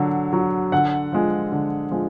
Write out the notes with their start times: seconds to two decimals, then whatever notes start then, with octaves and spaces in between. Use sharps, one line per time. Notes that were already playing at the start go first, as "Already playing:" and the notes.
Already playing: D3 F#3
0.33 F#3
0.72 D3 F#5
1.12 F3 G#3
1.52 D3
1.91 F3 G#3